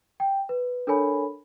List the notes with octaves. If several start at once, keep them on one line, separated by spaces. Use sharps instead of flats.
G5
B4
D4 A4 A#4 C#5 G#5 B5